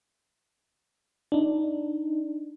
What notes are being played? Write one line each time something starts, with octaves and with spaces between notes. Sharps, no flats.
D4 D#4